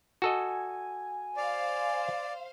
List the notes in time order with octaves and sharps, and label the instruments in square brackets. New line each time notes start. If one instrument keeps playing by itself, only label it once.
[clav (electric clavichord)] F#4 A4 D#5 [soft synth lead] G#5
[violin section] C5 F5 [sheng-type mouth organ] D5